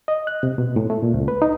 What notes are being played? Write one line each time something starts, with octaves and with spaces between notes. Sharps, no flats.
D#5
F#6
C3
B2
A2
A3
A#2
C#2
B4
D#4